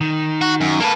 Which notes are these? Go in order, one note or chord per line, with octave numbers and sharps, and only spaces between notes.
D#3
F#4
F#2
A#3 A4 B4 A5